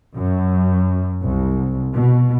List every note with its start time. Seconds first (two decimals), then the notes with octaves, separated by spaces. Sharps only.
0.14 F#2
1.21 C2
1.95 B2